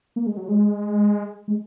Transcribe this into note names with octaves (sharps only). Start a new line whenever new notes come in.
A#3
G#3
F#3
G#3
G#3